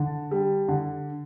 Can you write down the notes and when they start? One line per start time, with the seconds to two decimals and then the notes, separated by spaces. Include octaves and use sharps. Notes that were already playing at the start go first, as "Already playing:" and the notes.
Already playing: D3 A5
0.31 G3
0.68 D3